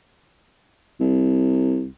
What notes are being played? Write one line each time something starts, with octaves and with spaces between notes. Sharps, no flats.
C2